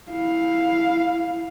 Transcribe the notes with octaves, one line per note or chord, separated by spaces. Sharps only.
E4 F5